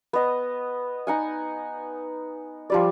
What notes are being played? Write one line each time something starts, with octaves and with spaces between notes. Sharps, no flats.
B3 D#5
D#4 F#5 G#5
F3 G3 D5